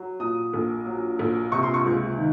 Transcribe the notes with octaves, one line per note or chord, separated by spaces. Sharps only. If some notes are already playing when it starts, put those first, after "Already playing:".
Already playing: F#3
A#2 D#6
A#1
F#3
A#1
C3 C#6
C6
C#6
C#2
D#3